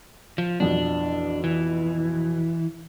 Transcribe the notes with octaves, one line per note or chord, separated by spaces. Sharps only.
F3
A1 F2 B2 D4
E3